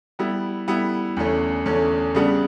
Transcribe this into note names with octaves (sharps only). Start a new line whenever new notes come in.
G3 B3 E4
G3 B3 E4
E2 D3 A3 C#4
E2 D3 A3 C#4
C#3 G3 B3 D4